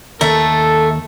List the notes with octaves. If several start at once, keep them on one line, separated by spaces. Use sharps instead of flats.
D#2 A3 A4 A#4